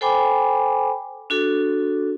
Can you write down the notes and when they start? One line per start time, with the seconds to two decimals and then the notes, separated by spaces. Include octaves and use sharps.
0.01 A4 C5 G5 G#5 B5 D6
1.30 D4 F#4 A4